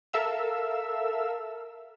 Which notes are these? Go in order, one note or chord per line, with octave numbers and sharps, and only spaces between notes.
A4 A#4 E5 F5 E6